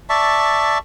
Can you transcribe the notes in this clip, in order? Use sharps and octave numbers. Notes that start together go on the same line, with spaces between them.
D5 E5 A5 C#6